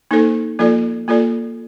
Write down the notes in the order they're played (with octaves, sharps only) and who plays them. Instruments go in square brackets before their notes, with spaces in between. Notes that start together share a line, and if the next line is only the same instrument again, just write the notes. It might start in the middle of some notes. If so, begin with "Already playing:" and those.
[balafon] A#3 D#4 A4 C5
F3 A#3 F4 A4 D5
A#3 F4 A4 D5